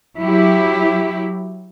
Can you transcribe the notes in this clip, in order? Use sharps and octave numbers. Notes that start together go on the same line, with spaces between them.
F#3 E4 G4